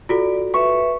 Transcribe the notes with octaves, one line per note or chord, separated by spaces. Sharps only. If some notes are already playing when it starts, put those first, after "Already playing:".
F4 F#4 A4 D5
B4 E5 C#6